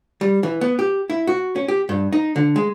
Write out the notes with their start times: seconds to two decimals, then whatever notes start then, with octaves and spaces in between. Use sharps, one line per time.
0.21 G3
0.43 E3
0.61 B3
0.79 G4
1.10 E4
1.27 F#4
1.56 C#4
1.68 G4
1.89 G2
2.13 D#4
2.36 D3
2.56 G#3